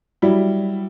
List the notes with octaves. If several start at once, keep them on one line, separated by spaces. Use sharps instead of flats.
F#3 G3 E4